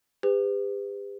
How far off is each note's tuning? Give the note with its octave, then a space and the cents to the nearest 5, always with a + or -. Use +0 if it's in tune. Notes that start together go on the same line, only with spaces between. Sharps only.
G4 +40 B4 +35